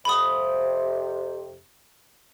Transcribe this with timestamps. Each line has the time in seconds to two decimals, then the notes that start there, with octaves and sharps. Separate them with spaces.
0.05 F2 C3 B5 D#6